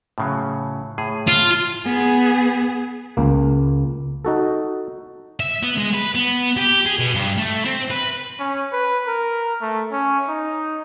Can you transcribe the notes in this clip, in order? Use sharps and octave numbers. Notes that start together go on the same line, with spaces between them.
A2 C#3 F#3
A2 G#4
F4
B3 G#4
C#2 A#3
D#4 F#4 A4
E5
B3
G#3
B4
B3
G4
G#4
B2
G2
A3
C4
B4
C#4
B4
A#4
A3
C#4
D#4